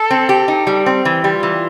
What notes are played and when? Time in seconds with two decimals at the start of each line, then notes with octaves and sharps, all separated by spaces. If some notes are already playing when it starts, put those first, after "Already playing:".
Already playing: A4
0.11 C4
0.29 G4
0.48 D#4
0.67 G3
0.86 C4
1.05 E3 G4
1.24 G3
1.33 F4
1.43 E3